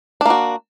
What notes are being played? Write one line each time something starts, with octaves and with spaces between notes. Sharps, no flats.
A#3 D4 F#4